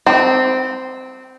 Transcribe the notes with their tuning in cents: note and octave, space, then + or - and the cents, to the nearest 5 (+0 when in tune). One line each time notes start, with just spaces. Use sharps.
C4 -10